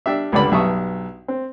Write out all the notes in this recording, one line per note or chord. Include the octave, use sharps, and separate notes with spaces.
G3 D4 G4 E5
C#2 G2 D3 D4 D5 B5
B1 G2 E5 A5 C#6 D#6
C4